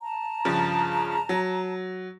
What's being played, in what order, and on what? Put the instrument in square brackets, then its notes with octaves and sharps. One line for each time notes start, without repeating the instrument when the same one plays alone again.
[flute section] A5 A#5
[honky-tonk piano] G2 C#3 F3
F#3